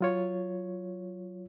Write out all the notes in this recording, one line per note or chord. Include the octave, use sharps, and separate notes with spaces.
F#3 F4 C#5